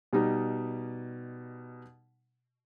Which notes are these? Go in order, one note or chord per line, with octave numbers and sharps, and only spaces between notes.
B2 G3 D#4